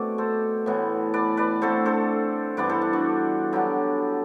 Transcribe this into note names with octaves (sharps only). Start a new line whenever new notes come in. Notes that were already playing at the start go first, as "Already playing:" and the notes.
Already playing: B2 A3 C4 D4 F#4 D5
A4 C5
A2 E3 B3
B4 D5
B4 D5
D3 A3 C4 A4 C5
A4 C5
G2 E3 B3 B4 D5
A4 C5
D4
D4 F#4
D3 F#3 B3 E4 G4